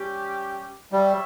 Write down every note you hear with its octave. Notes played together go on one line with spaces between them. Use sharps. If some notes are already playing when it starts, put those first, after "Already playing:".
Already playing: G3 C#4 G4
G3 C#5 E5